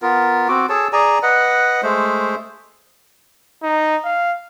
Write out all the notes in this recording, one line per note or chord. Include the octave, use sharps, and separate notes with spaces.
B3 F4 A#4
C4 F#4 D6
G#4 A4 C#5 A5
G#4 D5 G#5 A#5
B4 D#5 F#5
G#3 A3 C5
D#4
F5